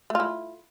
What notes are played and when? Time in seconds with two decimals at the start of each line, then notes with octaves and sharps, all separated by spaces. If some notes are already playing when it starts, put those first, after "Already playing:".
0.10 A3
0.15 F4
0.20 E4